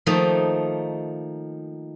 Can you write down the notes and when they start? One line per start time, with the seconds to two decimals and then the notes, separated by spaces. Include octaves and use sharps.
0.06 D#3 F3 A3 A#3 D#4